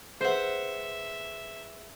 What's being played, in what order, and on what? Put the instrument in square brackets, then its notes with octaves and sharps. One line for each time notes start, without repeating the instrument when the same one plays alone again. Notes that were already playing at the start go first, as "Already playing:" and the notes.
[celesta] G#4 B4 [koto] C5 F#5 [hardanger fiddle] E5